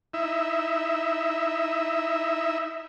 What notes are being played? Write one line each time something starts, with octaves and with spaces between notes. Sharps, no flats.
D#4 E4 E5